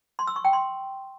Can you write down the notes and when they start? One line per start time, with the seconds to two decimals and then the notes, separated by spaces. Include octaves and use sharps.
0.19 C6
0.27 E6
0.36 C#6
0.45 G5
0.53 C6